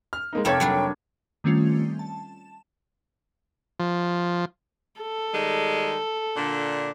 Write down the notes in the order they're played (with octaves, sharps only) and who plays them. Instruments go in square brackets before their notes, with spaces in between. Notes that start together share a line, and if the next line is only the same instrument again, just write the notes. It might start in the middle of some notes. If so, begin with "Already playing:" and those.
[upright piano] F6
G#3 A#3 D#4
[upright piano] F1 C#5 G#6 [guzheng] A#3 G4 A4 [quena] G5
[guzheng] F#3 G3 D4
[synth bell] D#3 G3 A3 C4 C#4 F4
A5
[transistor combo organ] F3
[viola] A4
[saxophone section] D#3 G3 G#3
A#2 D3 D4